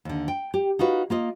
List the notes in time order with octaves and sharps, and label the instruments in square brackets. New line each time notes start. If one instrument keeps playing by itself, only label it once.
[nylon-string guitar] D#2 D3
G5
G4
D#4 F4 F#4 B4
A#3 F4 D#5